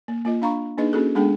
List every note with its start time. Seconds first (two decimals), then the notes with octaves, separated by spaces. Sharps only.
0.08 A#3
0.25 A#3 F4 D#5
0.42 D4 F5 A#5 B5 C#6
0.78 A#3 D4 D#4 G#4 B4 D#5
0.93 A#3 C#4 E4 F#4 G#4 A4
1.15 G#3 B3 D4 G#4 A4 G5